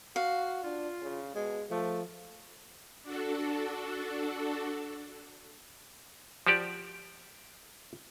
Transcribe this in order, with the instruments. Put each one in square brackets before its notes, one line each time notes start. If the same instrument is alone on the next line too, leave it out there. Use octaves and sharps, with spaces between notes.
[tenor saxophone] F#4 [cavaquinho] F5
[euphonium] D4 [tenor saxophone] F4
[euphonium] C#3
[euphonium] B2 [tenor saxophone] G#3
[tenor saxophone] F3 [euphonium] A3
[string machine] D4 F#4 A4
[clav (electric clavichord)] F3 F#4 G4 D5